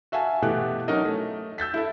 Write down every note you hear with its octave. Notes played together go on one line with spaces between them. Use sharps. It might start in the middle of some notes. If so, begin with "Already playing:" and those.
F#4 E5 F5 G#5 A5
B2 E3 A3 G4 F#6
F#3 C#4 D#4 A#4 D#5
A3
E6 G6 A6 B6
E4 A4 E5